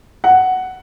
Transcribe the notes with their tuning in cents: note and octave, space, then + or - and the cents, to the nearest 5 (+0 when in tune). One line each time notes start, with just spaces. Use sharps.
F#5 +5